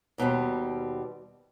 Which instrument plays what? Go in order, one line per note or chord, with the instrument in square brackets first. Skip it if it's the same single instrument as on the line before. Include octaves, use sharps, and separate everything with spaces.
[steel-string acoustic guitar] D#2 B2 G3 C4